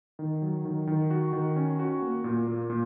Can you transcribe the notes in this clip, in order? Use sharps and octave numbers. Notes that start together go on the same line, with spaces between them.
D#3
F#3
D#3
D#3
F#4
D#3
C#4
F#4
A#3
A#2
A#3
A#2